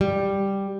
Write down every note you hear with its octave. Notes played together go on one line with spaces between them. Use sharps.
G3